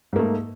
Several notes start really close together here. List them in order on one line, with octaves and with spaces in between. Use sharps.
G#2 A#3 A3